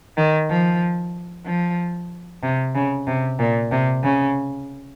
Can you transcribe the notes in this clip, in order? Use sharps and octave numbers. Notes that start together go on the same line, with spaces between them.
D#3
F3
F3
C3
C#3
C3
A#2
C3
C#3